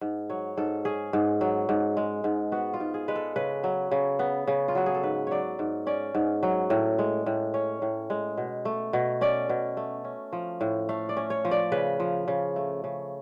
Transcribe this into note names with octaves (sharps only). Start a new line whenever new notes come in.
G#2
F#3 C#5
G#2 A4
C#4 G#4
G#2
F#3
G#2
G#3
G#2
B3 F#4
F4
G#2
G#4
G#3 B4
A4
C#3 B4
F#3
C#3
B3
C#3
F4
F#3 F#4
G#4
A4
G#2 B4
F#3 C#5 D5
G#2
C#4 D5
G#2
F#3
A2
G#3
A2
C#4 C#5
A2
G#3
B2
A3
B2
C#4 D5
B2
A3
C#4
F3
A2
A3 F5
D5
C#4
C#5
F3
D5
C#3 B4
F3
C#3
A3
C#3